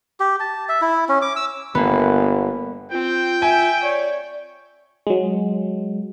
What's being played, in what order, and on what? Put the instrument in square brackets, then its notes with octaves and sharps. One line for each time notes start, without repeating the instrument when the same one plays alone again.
[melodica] G4
A5
E5
E4
C#4
D6
E6
[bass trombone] G1 [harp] A#3 B3
[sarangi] C4 [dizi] F4 [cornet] G5
[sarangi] E5 [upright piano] G#5
[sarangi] C#5 [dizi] D5
[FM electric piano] F#3 G#3